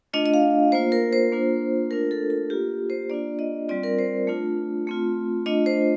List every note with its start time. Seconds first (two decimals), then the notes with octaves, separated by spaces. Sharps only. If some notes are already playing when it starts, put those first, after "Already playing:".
0.13 A3 D4 F4 D#5
0.26 D#5
0.34 F5
0.72 A#3 F4 C5
0.92 A#4
1.13 C5
1.32 A#3 D4 F4
1.91 A3 D4 F4 A#4
2.11 A4
2.30 A4
2.50 A#3 F4 G4
2.90 C5
3.10 A#3 D4 F4 D5
3.39 D#5
3.69 G3 C4 F4 D5
3.83 A#4
3.99 C5
4.27 A3 D4 F4
4.87 A3 C4 F4
5.46 A3 D4 F4 D#5
5.66 C5